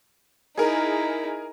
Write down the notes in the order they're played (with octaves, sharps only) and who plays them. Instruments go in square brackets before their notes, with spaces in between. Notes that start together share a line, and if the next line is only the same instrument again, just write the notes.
[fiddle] D#4 E4 [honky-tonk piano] G#4 A#4